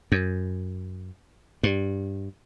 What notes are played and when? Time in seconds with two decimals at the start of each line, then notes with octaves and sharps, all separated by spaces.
0.12 F#2
1.63 G2